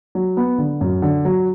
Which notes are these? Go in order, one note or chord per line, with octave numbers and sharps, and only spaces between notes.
F#3
B3
D3
F#2
D3
F#3